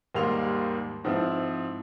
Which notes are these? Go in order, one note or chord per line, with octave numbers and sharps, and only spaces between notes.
D#2 G#2 G3 A#3 C6 F7
G#2 F3 C4 E4